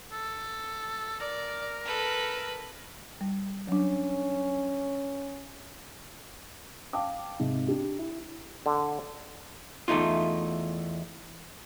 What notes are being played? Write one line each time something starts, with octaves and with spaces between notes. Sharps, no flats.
A4
A#4 D5
A4 B4
G3
F#3 C#4 D4
F5 G5 A5 D6
G#2 C3
D4 G4
E4
D3
E2 A3 D#4 F4